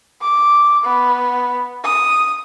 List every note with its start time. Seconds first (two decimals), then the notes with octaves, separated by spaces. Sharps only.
0.21 D6
0.84 B3
1.84 D#6